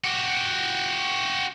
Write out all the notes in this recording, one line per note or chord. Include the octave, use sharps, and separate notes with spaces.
F#4 G4